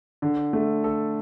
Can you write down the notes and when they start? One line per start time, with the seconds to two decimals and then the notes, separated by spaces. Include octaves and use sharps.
0.22 D3
0.53 A3
0.84 A4